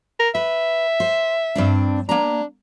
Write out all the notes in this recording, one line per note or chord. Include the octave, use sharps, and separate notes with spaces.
A#4
B4 E5
C5
G2 C4 D4
A#3 D4 A#5